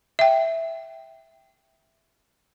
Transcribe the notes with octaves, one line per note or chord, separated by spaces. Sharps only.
E5 G5